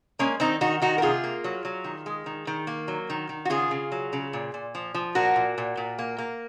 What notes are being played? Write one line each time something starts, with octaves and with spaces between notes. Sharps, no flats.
G#3 A#3 C#4
D#3 C4 D#4
D#3 D#4 F#4
D#3 D#4 F#4
A#4
C3 F4 G#4
A#3
F#3
F#3
D#3
G#3
D#3
D#3
A#3
F#3
D#3
D#3
F#4
C#3 F4 G#4
C#3
F#3
C#3
A#2
A#2
F3
F3
A#2 F#4 A#4
A#2
A#2
A#2
A#3
A#3